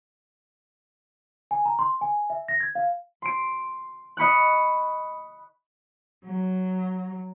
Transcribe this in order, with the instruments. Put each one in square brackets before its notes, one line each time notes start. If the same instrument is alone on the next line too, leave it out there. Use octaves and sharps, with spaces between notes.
[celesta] G#5
A#5
C6
G#5
E5
A#6
G#6
F5
[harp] C6 D7
D#5 B5 C#6 F#6
[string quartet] F#3